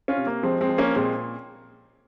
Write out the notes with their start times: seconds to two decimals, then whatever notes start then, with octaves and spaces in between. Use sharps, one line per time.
0.08 C#4 F4
0.17 C3
0.27 A#3
0.43 F3 G#3 C4
0.61 G#3 C4
0.69 F3
0.78 A#3 C#4
0.96 A#2 G#3 C4